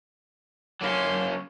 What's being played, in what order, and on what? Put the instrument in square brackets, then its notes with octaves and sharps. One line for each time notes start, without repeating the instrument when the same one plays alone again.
[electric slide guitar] F#3 A#3 C#4 [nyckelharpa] C6 D6